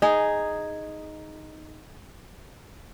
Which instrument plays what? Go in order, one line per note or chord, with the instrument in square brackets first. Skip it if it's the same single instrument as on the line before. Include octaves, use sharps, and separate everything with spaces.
[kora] D#4 G#4